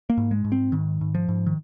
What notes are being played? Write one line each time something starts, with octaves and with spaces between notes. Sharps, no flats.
A#3
G#2
G#3
G#2
C4
G#2 D#3
G#2
F3
G#2
D#3